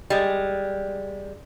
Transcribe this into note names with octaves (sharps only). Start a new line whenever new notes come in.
G3 G#3